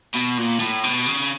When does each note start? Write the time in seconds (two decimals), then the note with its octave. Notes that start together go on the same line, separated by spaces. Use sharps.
0.14 B2
0.38 A#2
0.60 A2
0.84 B2
1.06 C#3